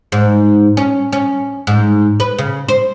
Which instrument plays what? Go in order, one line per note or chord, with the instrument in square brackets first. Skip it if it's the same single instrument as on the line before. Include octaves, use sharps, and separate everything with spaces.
[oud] G#2
C#4
C#4
G#2
B4
C#3
C5